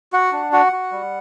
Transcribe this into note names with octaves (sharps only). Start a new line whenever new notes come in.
F#4 F#5
D4
F#4 F#5
F#4
G3